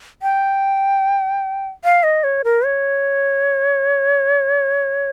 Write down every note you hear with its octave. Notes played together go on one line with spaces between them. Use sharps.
G5
F5
D#5
C#5
A#4
C#5